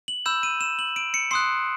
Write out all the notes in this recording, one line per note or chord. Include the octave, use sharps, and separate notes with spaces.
F#7
B5 E6 G6 E7
D#7
E7
F#7
D7
C#7
C6 D#6 F#6 C7